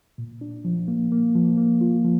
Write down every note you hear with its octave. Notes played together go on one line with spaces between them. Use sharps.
A#2
D4
F3
A#3
A#3
F3
A#3
F4
F3